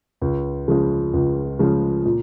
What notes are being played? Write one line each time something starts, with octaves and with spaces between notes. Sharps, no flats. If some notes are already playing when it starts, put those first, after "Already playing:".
C#2
C#3 F3 G#3
C#2
C#3 F3 G#3
A#2